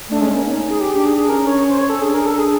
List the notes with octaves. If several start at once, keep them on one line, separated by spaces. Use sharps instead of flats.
A3 D4
G#3 C#4
A#3 C#4
C#4 D#4
G#4
G4
D4 G4
G#4
G#4
C#4 A#4
C#5
C5
C#5
A4
D4 G#4
A#4
A4
G#4